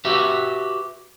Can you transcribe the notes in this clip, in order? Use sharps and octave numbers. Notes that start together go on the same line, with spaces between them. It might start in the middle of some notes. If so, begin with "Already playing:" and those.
F#4 G4 B4 E5